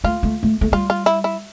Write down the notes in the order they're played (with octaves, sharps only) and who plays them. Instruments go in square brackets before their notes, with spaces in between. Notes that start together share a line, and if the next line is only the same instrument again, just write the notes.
[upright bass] A3 [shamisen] F4
[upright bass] A3
A3
A3
[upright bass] G3 [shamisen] F4
[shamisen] F4
E4
E4